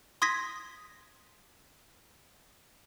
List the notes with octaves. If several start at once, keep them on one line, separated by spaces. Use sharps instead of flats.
C6 D#6 G#6 A#6 B6